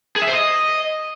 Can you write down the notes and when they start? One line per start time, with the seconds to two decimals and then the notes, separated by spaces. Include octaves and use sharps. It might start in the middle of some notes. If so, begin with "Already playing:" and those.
0.16 G#4
0.22 E5
0.28 C5
0.33 D#5